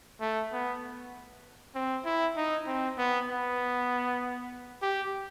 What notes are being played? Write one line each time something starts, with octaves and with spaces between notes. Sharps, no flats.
A3
B3
C4
E4
D#4
C4
B3
B3
G4